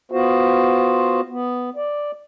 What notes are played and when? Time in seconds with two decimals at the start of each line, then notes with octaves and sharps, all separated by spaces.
0.12 B3 F4 F#4 C5
1.30 B3
1.76 D5